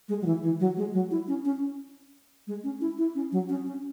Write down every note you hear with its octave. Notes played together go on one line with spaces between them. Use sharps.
G#3
F#3
E3
E3
F#3
G#3
F#3
E4
C#4
C#4
G#3
C#4
E4
E4
C#4
F#3
C#4
C#4